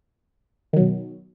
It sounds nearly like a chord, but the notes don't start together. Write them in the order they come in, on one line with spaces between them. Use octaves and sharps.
D#3 F#3 B2